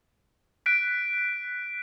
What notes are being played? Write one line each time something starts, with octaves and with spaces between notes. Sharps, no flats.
F#6 B6 D7